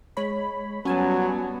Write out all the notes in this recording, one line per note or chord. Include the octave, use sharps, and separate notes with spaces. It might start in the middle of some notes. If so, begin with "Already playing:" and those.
G#3 C#5 B5
F#3 G3 B3 C#4 G#5 A5